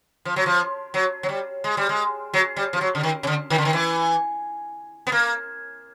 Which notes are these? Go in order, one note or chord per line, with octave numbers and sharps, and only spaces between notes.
F3
F#3
F3
F#3
F#3
G3
G#3
G3
G#3
F#3
G3
F3
F#3
D3
D#3
C#3
D3
D#3
D3
D#3
E3
B3
A#3